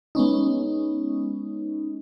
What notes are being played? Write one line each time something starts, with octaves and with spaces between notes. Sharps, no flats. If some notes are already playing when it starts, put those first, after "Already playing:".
G#3 B3 C#4 D#4